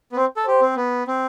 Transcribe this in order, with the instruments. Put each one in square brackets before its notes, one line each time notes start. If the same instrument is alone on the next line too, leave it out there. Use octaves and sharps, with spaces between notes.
[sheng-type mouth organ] B3
[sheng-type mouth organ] C4 [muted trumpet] C5
[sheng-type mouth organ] A4
[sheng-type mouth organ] G4 [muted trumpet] C5
[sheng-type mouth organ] C4
B3
C4